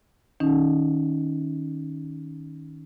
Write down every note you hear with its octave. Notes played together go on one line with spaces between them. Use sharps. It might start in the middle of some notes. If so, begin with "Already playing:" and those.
D#3 C#4 D#4